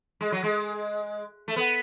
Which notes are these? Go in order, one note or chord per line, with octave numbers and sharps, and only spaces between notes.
G#3
F#3
G#3
A3
B3